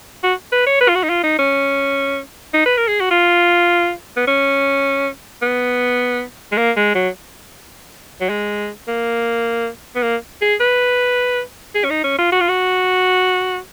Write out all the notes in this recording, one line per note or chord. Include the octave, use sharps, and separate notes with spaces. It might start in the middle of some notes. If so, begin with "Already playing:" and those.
F#4
B4
C#5
B4
F4
F#4
D#4
F4
D#4
C#4
D#4
B4
A#4
G#4
F#4
F4
B3
C#4
B3
G#3
A#3
G#3
F#3
F#3
G#3
A#3
B3
A#3
G#4
B4
G#4
C#4
D#4
C#4
F4
F#4
F4
F#4